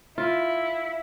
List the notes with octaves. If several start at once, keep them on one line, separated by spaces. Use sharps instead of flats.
E4 F4